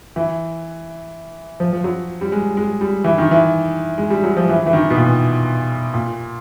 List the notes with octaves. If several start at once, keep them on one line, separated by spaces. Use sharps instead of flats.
E3
F3
F3
F#3
G3
G#3
G#3
G3
E3
D#3
E3
G#3
G3
F#3
F3
E3
E3
D#3
B2
A#2
A#2